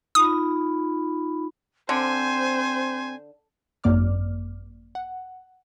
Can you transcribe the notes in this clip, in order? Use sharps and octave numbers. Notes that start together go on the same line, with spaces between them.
D#4 F4 B5 D#6
D3 C4 C5 G#5
G#1 F#2 A#3 D5 D6 F6
F#5